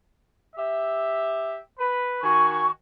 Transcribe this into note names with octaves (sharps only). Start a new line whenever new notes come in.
G4 E5
B4
D#3 F#4 G#5 C#6